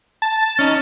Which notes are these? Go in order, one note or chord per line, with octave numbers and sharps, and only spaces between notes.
A5
C#4 D#4